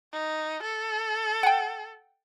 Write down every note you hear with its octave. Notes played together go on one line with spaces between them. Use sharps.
D#4
A4
F#5 G5